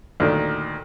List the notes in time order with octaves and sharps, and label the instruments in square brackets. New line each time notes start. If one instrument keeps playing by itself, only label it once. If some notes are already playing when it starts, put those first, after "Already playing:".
[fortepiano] D2 A#2 D#3